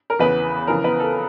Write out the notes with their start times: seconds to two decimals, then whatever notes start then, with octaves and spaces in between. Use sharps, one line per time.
0.10 A#4
0.19 E2 C#3 E3 B3 B4
0.67 F2 C#3 E3 A#4
0.84 B3 B4
1.00 A4